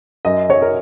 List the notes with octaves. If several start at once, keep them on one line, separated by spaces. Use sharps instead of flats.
F#2 D#5
F#3 C#5
A#4